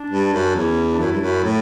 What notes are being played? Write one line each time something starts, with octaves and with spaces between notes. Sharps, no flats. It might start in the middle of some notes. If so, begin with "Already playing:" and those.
Already playing: D4
G2
F#2
E2 C#4
D4
F#2 E4
G2
F#2
A2